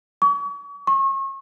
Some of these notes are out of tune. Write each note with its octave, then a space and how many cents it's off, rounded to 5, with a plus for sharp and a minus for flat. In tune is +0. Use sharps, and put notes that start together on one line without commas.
C#6 +40
C#6 -35